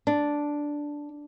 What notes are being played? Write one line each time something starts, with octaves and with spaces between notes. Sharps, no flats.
D4